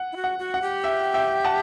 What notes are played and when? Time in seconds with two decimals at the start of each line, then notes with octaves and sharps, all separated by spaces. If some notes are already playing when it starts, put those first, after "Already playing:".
Already playing: F#5
0.12 E4
0.16 F#4
0.24 F#5
0.39 F#4
0.54 F#5
0.62 G4
0.84 E5 G5
1.14 E5 G5
1.44 F#5 A5